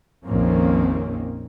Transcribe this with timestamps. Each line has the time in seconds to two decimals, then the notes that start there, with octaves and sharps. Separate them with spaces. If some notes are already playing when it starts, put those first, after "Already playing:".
0.24 A#1 F2 D#3 A#3 C4 C#4